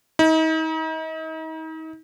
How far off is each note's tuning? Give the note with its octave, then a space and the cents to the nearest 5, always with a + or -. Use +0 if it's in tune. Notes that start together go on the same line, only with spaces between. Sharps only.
D#4 +40